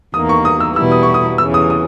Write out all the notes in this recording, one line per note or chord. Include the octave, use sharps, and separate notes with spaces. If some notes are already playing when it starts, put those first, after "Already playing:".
E2 D#3 A#3 D#6
C#6
D#6
E6
E2 B2 G3 B3 E4 E6
D#6
C#6
D#6
E2 C#3 E3 E6
D#6
D#6